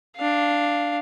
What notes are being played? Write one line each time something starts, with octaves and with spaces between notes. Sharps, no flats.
D4 F5